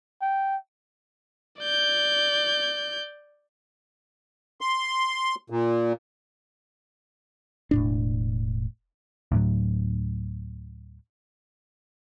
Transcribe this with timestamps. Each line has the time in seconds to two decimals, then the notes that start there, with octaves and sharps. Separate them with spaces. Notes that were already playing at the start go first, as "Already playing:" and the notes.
0.21 G5
1.60 D5 G6
4.61 C6
5.50 A#2
7.71 E1 A2 D4
9.32 D2 A2 F#3